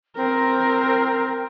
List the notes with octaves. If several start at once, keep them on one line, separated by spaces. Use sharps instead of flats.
C4 A#4